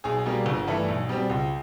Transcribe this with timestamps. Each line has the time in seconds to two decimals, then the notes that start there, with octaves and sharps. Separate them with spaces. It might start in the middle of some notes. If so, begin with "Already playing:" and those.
0.04 B1 G#4
0.26 B2 G3 A#3
0.46 G1
0.67 G2 E3 A3
0.88 B1
1.09 B2 G3 C4
1.29 C#2